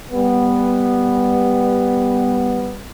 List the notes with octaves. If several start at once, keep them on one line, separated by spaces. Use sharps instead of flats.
G3 B3